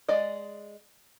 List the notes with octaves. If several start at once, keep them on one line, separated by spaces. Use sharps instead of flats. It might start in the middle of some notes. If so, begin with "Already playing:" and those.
G#3 D5 D#5